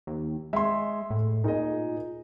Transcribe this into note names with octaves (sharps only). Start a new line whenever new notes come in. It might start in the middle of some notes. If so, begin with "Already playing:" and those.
D#2
G#3 E5 C6
A2
A#2 D#4 G#4 D#5